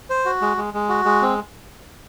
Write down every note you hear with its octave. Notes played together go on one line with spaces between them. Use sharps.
C5
F#4
G#3
G#3
G#3
F#4
G#3
C4